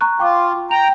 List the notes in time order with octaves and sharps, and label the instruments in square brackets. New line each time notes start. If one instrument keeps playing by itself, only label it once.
[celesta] A#5 C#6 F#6
[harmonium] F4 [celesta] G5 C#6 D6
[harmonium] G5 A#5 [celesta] F7